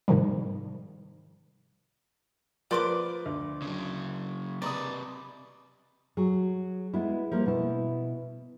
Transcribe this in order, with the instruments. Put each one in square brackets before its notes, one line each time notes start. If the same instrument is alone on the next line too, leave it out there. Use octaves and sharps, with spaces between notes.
[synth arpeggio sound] G#2 C3 D#3 F3 G3
[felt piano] F3 A#4 B4 [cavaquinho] D5 C6 D6
[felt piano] D2
[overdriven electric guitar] C#3 F#3
[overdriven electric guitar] C3 B4 [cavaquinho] D5 [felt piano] A#5 D#6
[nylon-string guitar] F#3 G#4
G#3 B3 E4
F3 G3 A#3
B2 E4